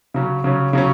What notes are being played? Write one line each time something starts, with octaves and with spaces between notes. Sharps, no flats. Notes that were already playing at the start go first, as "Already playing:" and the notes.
C#3 F#3 C#4
C#3 F#3 C#4
C#3 F#3 C#4